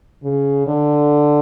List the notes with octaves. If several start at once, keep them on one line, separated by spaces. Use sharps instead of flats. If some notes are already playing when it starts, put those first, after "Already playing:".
C#3
D3